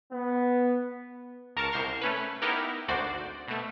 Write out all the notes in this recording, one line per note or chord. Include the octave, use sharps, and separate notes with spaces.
B3
C#2 A#4 A5 C#6 C#7
C2 C5 C6 C#6 F6
A3 C#4 B4
B3 D#4 E4 G4 A#4
G#1 D2 F#4 C5 D5
B2 A3